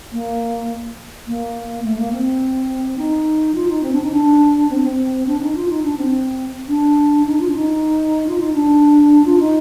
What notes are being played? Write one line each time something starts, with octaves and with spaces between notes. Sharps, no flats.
A#3
A#3
A3
A#3
C4
D#4
F4
D#4
C4
D4
D#4
D4
C4
C4
D4
D#4
F4
D#4
D4
C4
D4
D#4
F4
D4
D#4
F4
D#4
D4
F4
D#4